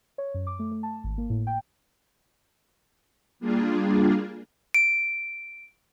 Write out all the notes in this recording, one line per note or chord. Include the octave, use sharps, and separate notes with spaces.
C#5
F#2
D6
A3
A3
A5
G#1
A#3
A2
G5
G3 A#3 D4 F4 G#4
D7